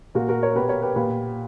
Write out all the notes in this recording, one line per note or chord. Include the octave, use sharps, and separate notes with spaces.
A#2 F#4 A#4
F#4 A#4
A#4 C#5
B2 G4 B4
A#4 C#5
G4 B4
A#2 G4 B4